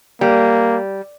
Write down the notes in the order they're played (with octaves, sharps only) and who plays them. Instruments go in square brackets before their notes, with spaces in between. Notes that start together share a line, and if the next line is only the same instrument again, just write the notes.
[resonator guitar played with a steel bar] G3 [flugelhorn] A#3